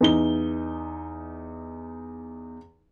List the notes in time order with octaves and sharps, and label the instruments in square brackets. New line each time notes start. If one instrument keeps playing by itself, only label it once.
[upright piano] E2 D#4 G7